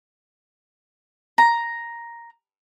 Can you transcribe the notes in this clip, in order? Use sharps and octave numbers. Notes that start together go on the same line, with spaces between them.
A#5